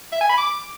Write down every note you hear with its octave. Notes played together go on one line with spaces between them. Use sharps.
E5
G#5
B5
D6